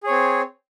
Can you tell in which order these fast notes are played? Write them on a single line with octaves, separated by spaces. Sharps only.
G#4 C#5 C4